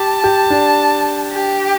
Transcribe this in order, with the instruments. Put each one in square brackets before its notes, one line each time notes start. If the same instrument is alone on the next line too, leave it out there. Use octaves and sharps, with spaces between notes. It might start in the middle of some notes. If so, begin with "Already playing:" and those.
Already playing: [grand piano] G4 [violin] A5
[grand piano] G4
D4
[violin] G4